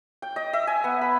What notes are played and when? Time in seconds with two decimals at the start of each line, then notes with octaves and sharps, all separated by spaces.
0.22 G5
0.36 D#5
0.53 E5
0.67 G#5
0.84 B3
1.01 B5